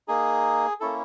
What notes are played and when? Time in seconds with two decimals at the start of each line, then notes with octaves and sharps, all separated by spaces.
0.08 A#3 D#4 G#4
0.80 A#3 C#4 E4 A4